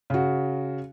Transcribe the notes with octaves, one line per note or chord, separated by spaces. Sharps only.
C#3 F#4